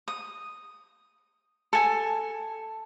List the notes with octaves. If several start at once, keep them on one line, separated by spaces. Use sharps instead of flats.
D#6
A4 G#5